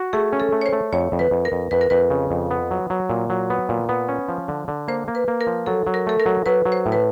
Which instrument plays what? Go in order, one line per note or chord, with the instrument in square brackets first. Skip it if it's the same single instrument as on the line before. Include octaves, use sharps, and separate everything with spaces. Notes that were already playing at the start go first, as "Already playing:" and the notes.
Already playing: [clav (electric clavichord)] F#4
[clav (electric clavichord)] A3 [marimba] G#4
[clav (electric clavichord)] C#4
[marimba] A4
[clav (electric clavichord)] A3
[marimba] C#5
C5
[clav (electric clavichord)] A3
[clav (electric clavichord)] F2 [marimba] C#5
[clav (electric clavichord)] F2
[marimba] B4
[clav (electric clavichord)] F2
[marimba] A#4
[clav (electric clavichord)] F2
[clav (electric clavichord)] F2 [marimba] B4
[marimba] A#4
[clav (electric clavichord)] F2 [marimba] B4
[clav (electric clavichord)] C#3
F2
B3
F#3
F#3
A#2
F#3
B3
A#2
B3
C#4
F3
D3
D3
[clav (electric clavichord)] A#3 [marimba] C5
[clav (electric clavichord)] A#3
[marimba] B4
[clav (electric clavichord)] A#3
[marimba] A#4
[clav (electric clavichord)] F3
[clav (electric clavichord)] F#3 [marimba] A4
[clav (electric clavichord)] F#3
[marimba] A#4
[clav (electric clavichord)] A3 [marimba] A4
[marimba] A#4
[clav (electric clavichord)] F#3
[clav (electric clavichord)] F#3 [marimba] B4
[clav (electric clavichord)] F#3
[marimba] C5
[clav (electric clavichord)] A2
[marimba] B4